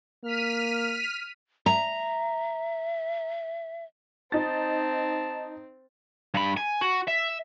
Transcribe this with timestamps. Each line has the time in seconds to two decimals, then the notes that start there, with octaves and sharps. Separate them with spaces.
0.24 A#3 F6 B6 D#7
1.66 E5 A#5
4.32 C4 D#4 A5 A6
6.34 G2 B5
6.57 G#5
6.81 F#4
7.07 E5